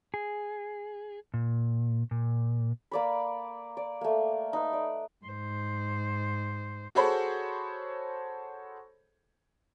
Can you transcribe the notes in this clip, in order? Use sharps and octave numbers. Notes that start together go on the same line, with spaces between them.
G#4
A#2
A#2
A#3 D5 B5
D5
A3 A#3
D#4 B4
D5
G#2 C5
F#4 G#4 A4 C5 C#5 B5